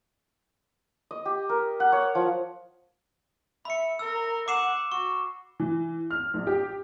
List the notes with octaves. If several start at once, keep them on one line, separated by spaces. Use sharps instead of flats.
D#5
G4
A#4
F#5
C#5
F3
E5 B5 C#7
A#4 E6
F#5 D6 C7 E7
F#4 C#6
E3
F6
A#1
G4